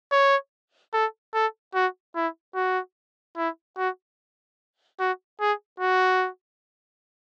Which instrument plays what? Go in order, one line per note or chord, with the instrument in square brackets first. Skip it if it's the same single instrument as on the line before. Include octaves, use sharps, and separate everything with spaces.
[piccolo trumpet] C#5
A4
A4
F#4
E4
F#4
E4
F#4
F#4
G#4
F#4